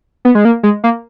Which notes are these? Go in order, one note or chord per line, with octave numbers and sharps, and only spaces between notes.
B3
G#3
A#3
G#3
A#3